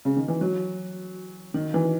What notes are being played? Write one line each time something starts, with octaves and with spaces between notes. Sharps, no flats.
C#3
D#3
E3
F#3
D#3
E3